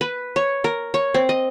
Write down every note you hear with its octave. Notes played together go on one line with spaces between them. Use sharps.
B4
C#5
A#4
C#5
C4
D#5